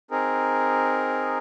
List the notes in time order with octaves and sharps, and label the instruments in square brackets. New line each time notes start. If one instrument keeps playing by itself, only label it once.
[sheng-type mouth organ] C4 D#4 G#4 A#4